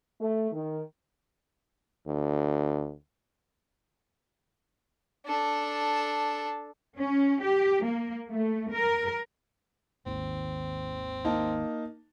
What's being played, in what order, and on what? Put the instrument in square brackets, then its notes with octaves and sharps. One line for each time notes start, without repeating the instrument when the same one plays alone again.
[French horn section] A3
D#3
[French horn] D2
[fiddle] D4 A4
[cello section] C#4
G4
A#3
A3
A#4
[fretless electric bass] G#1 D#2 [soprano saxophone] C4
[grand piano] A#3 D#4 A5